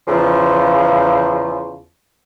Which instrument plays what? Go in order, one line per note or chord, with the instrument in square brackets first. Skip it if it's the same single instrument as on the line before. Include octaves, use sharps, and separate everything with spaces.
[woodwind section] E2 C#3 F3